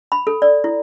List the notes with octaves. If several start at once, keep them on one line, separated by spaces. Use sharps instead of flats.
B5
A4
D5
E4